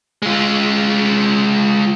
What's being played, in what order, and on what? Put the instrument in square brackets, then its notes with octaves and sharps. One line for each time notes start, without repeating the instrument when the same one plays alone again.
[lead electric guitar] G#3 F4